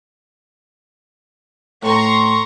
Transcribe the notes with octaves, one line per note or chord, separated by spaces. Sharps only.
A2 A#5 C6 C#6